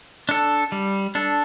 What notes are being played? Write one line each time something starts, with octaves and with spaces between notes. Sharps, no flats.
D4 A4
G3
D4 A4